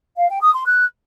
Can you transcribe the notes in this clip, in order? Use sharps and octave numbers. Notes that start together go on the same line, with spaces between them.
F5
G5
D#6
C6
F#6